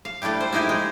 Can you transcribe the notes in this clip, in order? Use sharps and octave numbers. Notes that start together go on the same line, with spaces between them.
F5
G3 A3 D4 E4 G4
C5
A#3 D#4 E4 G4 G#4
G#3